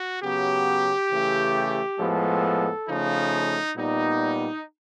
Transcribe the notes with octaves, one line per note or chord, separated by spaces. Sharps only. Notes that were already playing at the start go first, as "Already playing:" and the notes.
Already playing: F#4
C#3 F#3 B3 G4
C#3 E3 A3
A2 F3 G#3 B3 A4
C#3 F3 A3 D#4
A#2 G3 B3 D#4